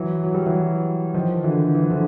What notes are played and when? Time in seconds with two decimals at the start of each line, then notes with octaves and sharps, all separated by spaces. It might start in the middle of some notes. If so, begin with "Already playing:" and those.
Already playing: E3 F#3
0.24 F#3
0.35 G3
0.46 E3 F#3
1.14 D#3 F3
1.44 D3 E3
1.75 E3
1.83 F3
1.91 D3 E3